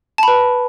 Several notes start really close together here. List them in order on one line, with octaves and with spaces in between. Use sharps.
A5 B5 B4